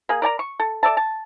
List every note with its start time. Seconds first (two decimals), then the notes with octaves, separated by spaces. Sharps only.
0.09 A#3 G#4
0.22 A#4 D5 G#5 A#5
0.39 C#6
0.60 A4
0.83 A4 D5 E5 A5
0.97 A5